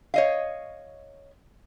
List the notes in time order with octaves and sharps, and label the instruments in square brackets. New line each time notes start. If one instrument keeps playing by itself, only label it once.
[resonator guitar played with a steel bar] C#5 D#5 F5